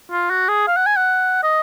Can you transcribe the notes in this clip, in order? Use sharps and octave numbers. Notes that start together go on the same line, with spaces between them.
F4
F#4
G#4
F5
F#5
G#5
F#5
D#5